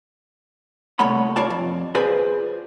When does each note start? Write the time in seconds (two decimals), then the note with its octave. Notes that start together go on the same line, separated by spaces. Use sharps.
0.99 C2 A#2 A3 C#5 F#5 B5
1.36 F4 C#5 D5 A5
1.50 F2
1.95 F4 G#4 B4 C5 D5 G#5